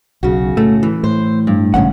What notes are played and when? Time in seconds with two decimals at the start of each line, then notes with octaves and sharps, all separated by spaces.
0.23 B1 C#3 F#4
0.57 A2 A3
0.83 E3
1.04 A2 C5
1.47 G2
1.74 A1 A2 C#3 G#3 C#4 F#5